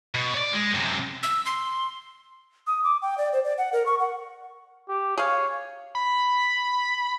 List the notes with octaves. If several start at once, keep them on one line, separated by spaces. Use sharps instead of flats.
B2
C#5 D5
G#3
F#2 C3
E6
C6
D#6
D6
G5
D5
C5
D5
F#5
A#4
C#6
F#5
G4
G#4 C#5 F5
B5